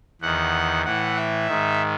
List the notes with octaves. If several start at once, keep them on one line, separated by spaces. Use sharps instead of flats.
E2 D#3 F#5
A2 E3 F#5
E5
G#2 D#3